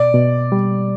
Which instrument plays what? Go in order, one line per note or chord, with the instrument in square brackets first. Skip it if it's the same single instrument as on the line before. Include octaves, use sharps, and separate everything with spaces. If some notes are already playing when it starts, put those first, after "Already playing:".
Already playing: [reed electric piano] B2 [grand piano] D5
[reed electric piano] B2
G3